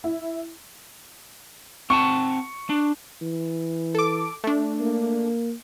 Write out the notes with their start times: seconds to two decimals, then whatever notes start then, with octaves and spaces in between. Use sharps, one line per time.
0.04 E4
1.90 C4 F#5 A5 C#6
2.70 D4
3.22 E3
3.95 A4 D6
4.44 A3 D4
4.80 A#3